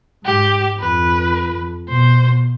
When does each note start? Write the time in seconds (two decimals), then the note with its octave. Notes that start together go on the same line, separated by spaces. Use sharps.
0.25 G#2 G4
0.79 F2 B4
1.88 B2 C5